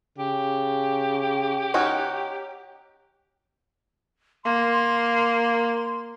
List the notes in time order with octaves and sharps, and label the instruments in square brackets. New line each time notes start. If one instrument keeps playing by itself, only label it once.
[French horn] C#3 [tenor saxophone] G4
[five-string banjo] C#4 D#4 F#4
[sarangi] A#3 [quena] C6